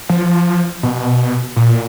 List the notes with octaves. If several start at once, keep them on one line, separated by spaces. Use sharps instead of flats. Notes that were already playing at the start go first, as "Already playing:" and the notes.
F3
B2
A#2